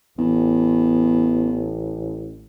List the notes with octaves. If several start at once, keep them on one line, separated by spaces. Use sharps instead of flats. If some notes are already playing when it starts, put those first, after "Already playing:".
A1 E2